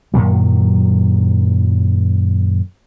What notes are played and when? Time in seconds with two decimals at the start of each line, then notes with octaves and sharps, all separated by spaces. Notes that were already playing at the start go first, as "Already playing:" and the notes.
0.14 F#2 A#2 D#3 F#3